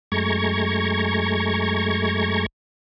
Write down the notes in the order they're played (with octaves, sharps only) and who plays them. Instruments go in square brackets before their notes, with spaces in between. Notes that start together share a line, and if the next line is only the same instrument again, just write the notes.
[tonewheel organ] F#2 G#3 A3 A#5 C#6 G#6